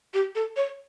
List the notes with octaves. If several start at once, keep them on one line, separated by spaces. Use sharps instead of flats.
G4
A4
C#5